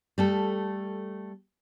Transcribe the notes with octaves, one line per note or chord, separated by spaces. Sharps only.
G3 A3 A4